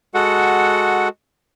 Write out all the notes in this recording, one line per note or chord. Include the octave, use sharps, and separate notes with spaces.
G#3 F#4 A4 F#5